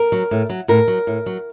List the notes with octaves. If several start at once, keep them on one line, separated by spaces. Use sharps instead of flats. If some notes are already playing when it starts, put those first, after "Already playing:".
Already playing: A#4
F#3
A2
F#3
A2 A#4
F#3
A2
F#3